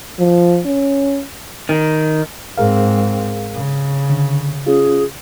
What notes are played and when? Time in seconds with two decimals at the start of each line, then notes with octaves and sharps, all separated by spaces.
0.19 F3
0.66 C#4
1.69 D#3
2.58 G#2 C4 G#4 A#4 F5
3.54 C#3
4.10 D3
4.66 C#4 F4 G#4